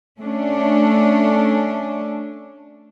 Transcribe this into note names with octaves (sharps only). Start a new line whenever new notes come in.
A3 C#4 D4